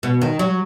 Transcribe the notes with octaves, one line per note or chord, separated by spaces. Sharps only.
B2
D#3
F#3